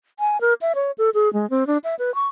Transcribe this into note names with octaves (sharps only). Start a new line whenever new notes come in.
G#5
A#4
E5
C#5
A4
G#4
G#3
C4
D4
E5
B4
C#6